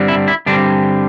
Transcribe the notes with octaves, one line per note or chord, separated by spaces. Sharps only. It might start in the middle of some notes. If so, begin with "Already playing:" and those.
Already playing: G2 D3 G3 C4
E4
E4
G2 D3 G3 C4 D4